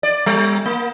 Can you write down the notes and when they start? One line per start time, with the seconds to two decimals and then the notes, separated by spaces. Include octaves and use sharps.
0.03 D5
0.26 G3
0.66 A#3